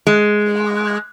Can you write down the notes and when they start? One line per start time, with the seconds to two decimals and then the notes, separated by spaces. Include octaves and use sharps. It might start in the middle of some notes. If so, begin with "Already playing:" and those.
0.07 G#3